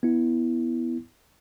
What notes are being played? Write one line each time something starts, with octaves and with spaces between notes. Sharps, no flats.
B3 E4